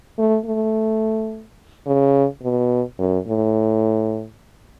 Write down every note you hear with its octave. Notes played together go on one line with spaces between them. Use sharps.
A3
A3
C#3
B2
F#2
A2